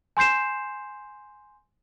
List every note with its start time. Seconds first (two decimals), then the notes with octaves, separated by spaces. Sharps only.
0.17 G#5 C6 G6 C7 E7